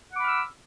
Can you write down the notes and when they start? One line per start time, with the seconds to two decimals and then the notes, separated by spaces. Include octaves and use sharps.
0.12 F#5
0.15 D6
0.18 B5
0.21 F6
0.24 E6